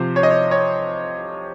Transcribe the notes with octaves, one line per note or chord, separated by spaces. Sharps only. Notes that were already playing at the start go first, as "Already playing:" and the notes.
Already playing: C3 F3 C5
C#5
D#5
C#5
C#5